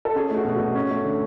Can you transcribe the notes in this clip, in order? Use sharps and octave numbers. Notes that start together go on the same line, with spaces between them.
A4
C#4 G#4
A3
F#4
B2
B2 F#4
C#4
A3
D3